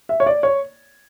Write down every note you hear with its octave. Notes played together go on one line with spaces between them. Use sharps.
E5
C#5
D5
C#5